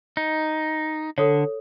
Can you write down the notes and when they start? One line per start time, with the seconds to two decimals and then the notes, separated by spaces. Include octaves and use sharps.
0.17 D#4
1.18 D3 A4 C#5